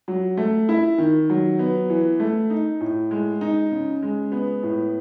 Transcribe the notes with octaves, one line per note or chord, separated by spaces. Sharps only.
F#3
A3
E4
D#3
F#3
B3
E3
A3
D#4
A2
G#3
D#4
C#3
G#3
B3
A2